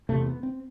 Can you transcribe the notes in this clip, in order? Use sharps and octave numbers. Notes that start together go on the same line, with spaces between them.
E2 C3 A3
B3
C4